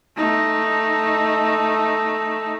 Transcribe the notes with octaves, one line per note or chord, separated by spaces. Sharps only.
A3 D#4